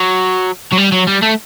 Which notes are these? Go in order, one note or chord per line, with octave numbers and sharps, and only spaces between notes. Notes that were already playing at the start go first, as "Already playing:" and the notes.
Already playing: F#3
F#3
G3
F#3
G3
A3